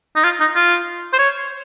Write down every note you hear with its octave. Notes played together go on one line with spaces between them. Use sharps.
D#4
F4
D#4
F4
C5
C#5